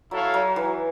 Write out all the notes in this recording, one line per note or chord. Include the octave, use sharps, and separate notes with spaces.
F#3 E4 A4 C#5 F5
F#3
E3